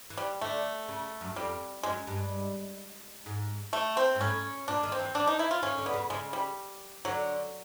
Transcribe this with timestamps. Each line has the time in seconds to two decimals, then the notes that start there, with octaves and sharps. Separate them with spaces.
0.10 E3
0.17 G3
0.41 D3 A3
0.88 C#3
1.21 F#2
1.36 F2 G3
1.83 F#2 G#3
2.07 G2
3.26 G#2
3.73 A3
3.97 C4
4.15 G#2
4.21 A2 C#4
4.68 A#2 D4
4.83 D#3
4.92 C4
4.99 E3
5.15 E3 D4
5.27 D#4
5.39 E4
5.51 F4
5.62 D#3 C#4
5.78 D3
5.86 B3
5.94 C#3
6.10 C#3 G#3
6.33 G3
7.05 D3 F#3